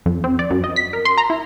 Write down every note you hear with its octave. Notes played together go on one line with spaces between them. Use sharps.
F2
C4
D5
F#2
D#5
B6
A#4
C6
A#5
E4